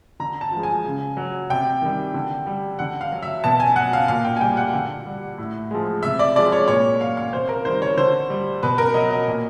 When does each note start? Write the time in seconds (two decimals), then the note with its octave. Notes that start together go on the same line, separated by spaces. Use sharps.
0.20 D3 A#5
0.41 A5
0.52 F3 G#3
0.63 G#5
0.85 C#3
1.17 F#3
1.50 C3 G5
1.82 D#3 G3
2.14 D3
2.47 G3
2.79 D3 F#5
3.01 F5
3.12 F#3
3.23 E5
3.44 B2 A5
3.60 G#5
3.76 F#3 F#5
3.93 F5
4.08 A#2 F5
4.24 G5
4.36 G#5
4.41 G3 G5
4.57 F#5
4.74 D3
5.06 G3
5.38 A2
5.71 F3 G#3
6.03 C3 E5
6.19 D5
6.36 F3 G#3 D5
6.52 C#5
6.68 A#2 C#5
7.01 F#3 F5
7.17 F5
7.33 C3 C5
7.49 A#4
7.65 D#3 G3 C5
7.82 C#5
7.97 D3 C5
8.30 G3
8.63 B2 B4
8.78 A#4
8.94 F#3 D#5
9.11 D#5
9.28 A#2